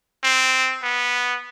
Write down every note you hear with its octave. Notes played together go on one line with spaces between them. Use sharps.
C4
B3